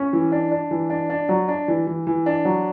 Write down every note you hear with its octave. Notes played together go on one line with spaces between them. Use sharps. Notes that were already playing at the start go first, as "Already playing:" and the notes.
Already playing: C#4
E3
D4
D4
E3
D4
D4
F#3
D4
E3
E3
E3
D4
F#3